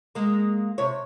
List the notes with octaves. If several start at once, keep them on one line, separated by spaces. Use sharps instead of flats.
G#3 A#3
C3 C#5